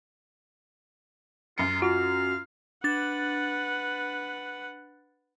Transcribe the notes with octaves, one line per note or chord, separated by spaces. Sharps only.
F#2 F4 C#7
F4 F#4 F5
D4 B4 F#5 A6